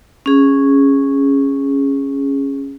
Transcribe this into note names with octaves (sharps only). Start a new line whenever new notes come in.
C#4 G#4